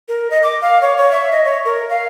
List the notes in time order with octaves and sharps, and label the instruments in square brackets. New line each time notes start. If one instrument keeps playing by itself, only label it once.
[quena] A#4
D#5
D6
F5
C#5
C#5
E5
D#5
C#5
A#4
F5